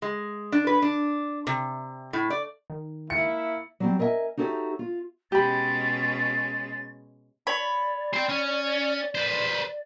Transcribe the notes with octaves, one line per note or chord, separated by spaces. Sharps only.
G#3
D4
B4
D4
C3
A2
D5
D#3
A#3 E4 E5 C#7
F#3 G3 C4
A#4 D#5 E5 G5 G#5
D#4 F#4 G4 A4 C#5 E5
F4
B2 G#3 C#4 G4 B5 A6
C#5 D5 B5
C5 G5
C#4
B4 C5